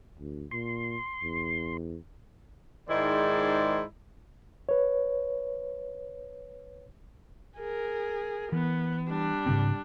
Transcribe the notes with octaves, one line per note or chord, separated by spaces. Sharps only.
D2
A#2 C6
E2
G#2 D#3 G#3 E4 C5 D5
B4 C#5
G#4 A#4
E3 B3
G3 D4
G#2 C#3 C4